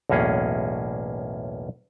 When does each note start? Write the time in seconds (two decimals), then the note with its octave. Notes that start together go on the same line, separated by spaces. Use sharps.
0.10 B1 E2 A2 A#3 C#4 G#4